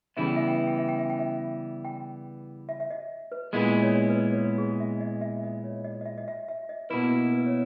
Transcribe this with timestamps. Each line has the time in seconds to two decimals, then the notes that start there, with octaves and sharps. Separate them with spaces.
0.17 C#3 E3 G3 B3 E4 E5
0.26 G5
0.36 E5
0.47 G5
0.57 E5
0.67 G5
0.78 E5
0.88 G5
0.99 E5
1.10 G5
1.19 E5
1.85 G5
2.69 E5
2.80 E5
2.90 D#5
3.32 B4
3.53 A#2 G#3 B3 E4 A#4
3.82 C#5
4.10 B4
4.31 C#5
4.37 B4
4.58 G#4
4.80 E5
5.01 D#5
5.21 E5
5.43 D#5
5.64 C#5
5.84 D#5
6.01 D#5
6.06 E5
6.18 D#5
6.28 E5
6.49 E5
6.69 D#5
6.90 B2 A#3 E4 B4
7.32 B4
7.46 C#5